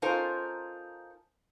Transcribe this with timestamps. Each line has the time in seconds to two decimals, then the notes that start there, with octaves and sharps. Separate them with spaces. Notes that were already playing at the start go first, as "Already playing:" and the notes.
0.02 C#4 D#4 F4 A4 A#4 C5